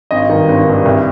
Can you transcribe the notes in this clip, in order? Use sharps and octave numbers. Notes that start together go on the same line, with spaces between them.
G#1 D#5
G2 D#3
G#1
G2 D#3
C2